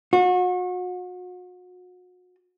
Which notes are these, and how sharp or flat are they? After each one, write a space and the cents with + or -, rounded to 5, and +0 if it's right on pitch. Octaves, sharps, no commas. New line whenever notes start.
F#4 -35